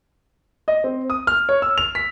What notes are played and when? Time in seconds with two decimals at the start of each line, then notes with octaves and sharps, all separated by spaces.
0.68 D#5
0.84 C4
1.10 D#6
1.27 F6
1.49 C#5
1.62 E6
1.78 F7
1.95 B6